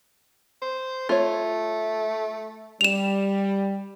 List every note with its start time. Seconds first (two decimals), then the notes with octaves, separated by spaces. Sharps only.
0.62 C5
1.09 A3 F4 C#5
2.81 G3 E7 F7